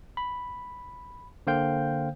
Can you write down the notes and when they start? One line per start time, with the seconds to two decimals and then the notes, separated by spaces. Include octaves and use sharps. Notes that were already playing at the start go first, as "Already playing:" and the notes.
0.17 B5
1.47 D3 A#3 C5 F5 G5 G6